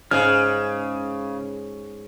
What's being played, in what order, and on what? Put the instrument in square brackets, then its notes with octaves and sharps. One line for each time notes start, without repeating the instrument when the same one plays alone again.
[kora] G#2 G#4 F5 [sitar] C#3 [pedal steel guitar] F6